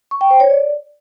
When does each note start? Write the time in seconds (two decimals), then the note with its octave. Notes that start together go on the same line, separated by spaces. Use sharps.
0.11 C#6
0.21 G5
0.31 C5
0.40 C#5
0.50 D5